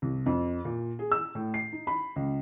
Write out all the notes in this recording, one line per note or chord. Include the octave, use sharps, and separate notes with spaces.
C2
F2
A#2
G#4
E6
A2
C7
D#4
B5
C#2